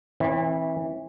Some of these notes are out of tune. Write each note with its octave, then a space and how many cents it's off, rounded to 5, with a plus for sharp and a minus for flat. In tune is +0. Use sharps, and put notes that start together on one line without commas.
E3 -20 C4 +40